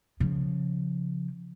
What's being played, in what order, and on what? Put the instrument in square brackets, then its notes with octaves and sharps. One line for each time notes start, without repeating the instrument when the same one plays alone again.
[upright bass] C#3 F3